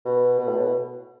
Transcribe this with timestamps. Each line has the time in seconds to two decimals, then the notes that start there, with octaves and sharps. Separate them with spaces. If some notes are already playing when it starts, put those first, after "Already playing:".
0.05 B2
0.38 B2
0.48 A2
0.57 B2